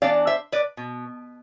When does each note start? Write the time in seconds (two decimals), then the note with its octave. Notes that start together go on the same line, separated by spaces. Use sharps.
0.02 E3 B3 D4 D5 F5
0.27 C5 E5
0.52 B4 D5
0.77 B2